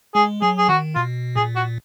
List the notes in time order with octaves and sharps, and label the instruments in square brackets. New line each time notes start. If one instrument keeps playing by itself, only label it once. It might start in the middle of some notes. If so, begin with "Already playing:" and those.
[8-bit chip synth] G#3 [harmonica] G#4
[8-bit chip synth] F#3 [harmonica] G#4
[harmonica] G#4
[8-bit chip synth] D#3 [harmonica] F#4
[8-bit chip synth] B2 [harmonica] F4
[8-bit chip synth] A#2 [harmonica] G#4
[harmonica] F#4